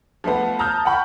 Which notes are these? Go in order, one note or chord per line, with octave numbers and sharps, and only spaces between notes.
F3 A3 B3
A5 A#5 D#6 F6 G6
F#5 G5 B5 C#6